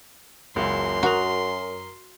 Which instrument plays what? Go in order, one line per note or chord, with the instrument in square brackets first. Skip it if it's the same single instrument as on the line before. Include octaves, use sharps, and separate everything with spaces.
[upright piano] F#1 C#2 [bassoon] F#2 [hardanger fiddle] C6
[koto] F#4 [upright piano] A#4 D#6 F7